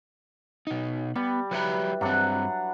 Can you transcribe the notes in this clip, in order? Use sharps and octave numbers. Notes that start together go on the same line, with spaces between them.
B2 D#4
G3 B3
F#3 E4 G4 B4 A#5
G2 F#3 C4 D4 F#5